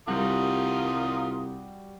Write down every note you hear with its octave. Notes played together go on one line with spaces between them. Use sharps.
C2 G3 F4 F#4 A#4 D#6